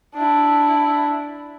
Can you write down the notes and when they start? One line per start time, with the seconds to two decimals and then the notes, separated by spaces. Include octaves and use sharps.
0.15 D4 E4